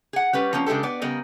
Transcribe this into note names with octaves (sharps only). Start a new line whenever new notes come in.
G#4 F#5
G3 C#4 B4
F3 A#3 C4 C#4
C#3 G#3 D4 G4 A4
B3 D5
C#3 G3 B3 A#4 D#5